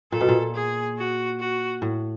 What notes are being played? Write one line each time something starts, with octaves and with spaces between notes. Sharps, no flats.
A#2 A4
B2
A#2
G#4
F#4
F#4
A2